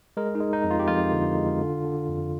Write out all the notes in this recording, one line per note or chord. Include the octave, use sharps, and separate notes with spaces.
G#3 A#4
D#4
G#3
D#4
F2
F4
G4
F2 F4
D3
G#3
D3
D3
F2